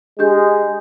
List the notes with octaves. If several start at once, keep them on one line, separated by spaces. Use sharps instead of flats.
G#3 D4 G4 G6